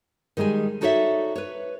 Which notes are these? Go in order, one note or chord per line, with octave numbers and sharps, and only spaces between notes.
D#3 G3 G#3 G#4 G#5
D#4 F#4 A4 C#5 D5 E5
B4 C#5